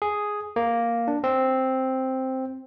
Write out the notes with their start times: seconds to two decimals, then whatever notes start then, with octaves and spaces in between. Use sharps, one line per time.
0.02 G#4
0.56 A#3
1.08 D4
1.24 C4